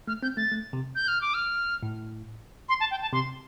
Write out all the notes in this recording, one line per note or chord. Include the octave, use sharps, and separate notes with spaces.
A3 F6
C4 G6
A3 A6
A3
C3
G6
F6
D6
F6
A2
C6
A5
G5
A5
C3 C6